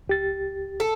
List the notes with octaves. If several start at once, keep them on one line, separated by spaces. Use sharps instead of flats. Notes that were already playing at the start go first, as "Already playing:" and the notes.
C#2 G4 A6
A4